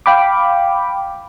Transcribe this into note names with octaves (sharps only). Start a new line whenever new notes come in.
F5 G5 B5 D6